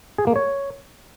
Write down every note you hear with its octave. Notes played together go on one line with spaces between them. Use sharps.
G#4
A#3
C#5